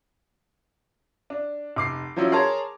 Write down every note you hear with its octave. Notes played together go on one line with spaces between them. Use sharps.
D4
F1 D6 C7
F3 F#3 C#4 E4
G#4 A#4 C#5 A5 C6